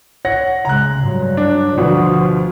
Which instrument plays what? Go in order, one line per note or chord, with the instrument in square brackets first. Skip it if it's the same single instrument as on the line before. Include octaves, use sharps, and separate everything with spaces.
[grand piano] C#5 F#5 A#6
[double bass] C#3 G#3 [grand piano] A#5 F#6
[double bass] G2 F#3
[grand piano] D4
[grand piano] D2 B2 [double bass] F3